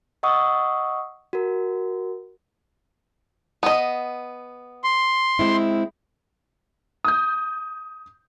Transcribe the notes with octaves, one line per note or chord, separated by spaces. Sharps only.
D#5 F#5 C#6 D#6 E6
F#4 A#4
B3 D#5
C6
G#3 C4 E4
D#6 G6